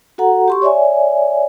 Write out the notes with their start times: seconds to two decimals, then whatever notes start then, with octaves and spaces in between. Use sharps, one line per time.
0.18 F#4 A4 F#5 A#5
0.48 G4 C6 C#6
0.62 C#5 D5 E5 G#5